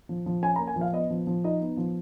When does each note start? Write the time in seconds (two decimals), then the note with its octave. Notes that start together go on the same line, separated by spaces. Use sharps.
0.09 F3
0.26 F3
0.42 C#4 G#5
0.56 A#5
0.59 A#3
0.67 G#5
0.76 F3
0.81 F5
0.93 B3 D#5
1.10 F3
1.27 F3
1.44 D#4 D#5
1.62 B3
1.77 F3